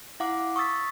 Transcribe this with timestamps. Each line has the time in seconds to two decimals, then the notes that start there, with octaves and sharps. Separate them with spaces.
0.20 E4 F5 F#5 D6
0.56 C#6 D#6 E6 A6 B6